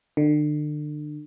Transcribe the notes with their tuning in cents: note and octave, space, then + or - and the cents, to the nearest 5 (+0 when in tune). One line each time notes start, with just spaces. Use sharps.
D3 +35